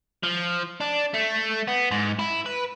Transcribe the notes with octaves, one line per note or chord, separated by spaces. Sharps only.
F3
D4
A3
B3
G#2
E4
B4